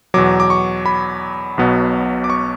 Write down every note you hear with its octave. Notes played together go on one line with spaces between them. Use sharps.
E2 B2 F#3 D6
D6
C#6
B5
B1 B2 F#3 B3
D6
C#6